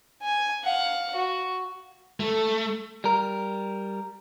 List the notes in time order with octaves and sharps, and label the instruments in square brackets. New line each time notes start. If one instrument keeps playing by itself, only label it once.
[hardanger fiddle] G#5
F5 F#5
F#4
[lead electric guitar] A3
[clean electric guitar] G3 A#4